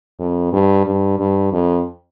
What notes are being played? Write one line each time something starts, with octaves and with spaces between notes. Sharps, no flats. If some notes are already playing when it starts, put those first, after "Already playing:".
F2
G2
G2
G2
F2